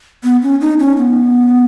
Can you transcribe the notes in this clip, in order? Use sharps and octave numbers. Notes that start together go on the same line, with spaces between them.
B3
C#4
D#4
C#4
B3